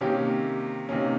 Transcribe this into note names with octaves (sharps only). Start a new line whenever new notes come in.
C3 D#3 A#3 C#4 G4
C3 D#3 A#3 C#4